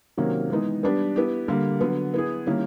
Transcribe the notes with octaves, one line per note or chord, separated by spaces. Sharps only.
C3 D#3 F#3 A#3 C#4
E3 G#3 B3 D#4
G3 B3 D4 G4 B4
B3 E4 G4
D3 G3 A#3
D3 F#3 B3
B3 E4 G#4
D#3 G3 A#3 C#4 E4